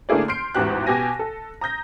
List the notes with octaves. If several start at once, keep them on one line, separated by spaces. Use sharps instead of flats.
D3 A3 A#3 E4 G#4 D5
C6 F6 G6 C7 D7
A1 E2 G#2 F#4 G4 F#6
B2 G4 G#5 A#6 D#7
A4
A#5 D#6 G6 A#6